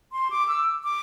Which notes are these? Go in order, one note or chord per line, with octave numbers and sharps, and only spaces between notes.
C6
D6
E6
D6